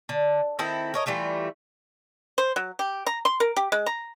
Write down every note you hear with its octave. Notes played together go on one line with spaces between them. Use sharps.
D3
D#3 C4 E4 A4
A#4 C#5 D#5
E3 G3 A3 F4
C5
F#3
G4
A#5
C6
A#4
G4
G#3
A#5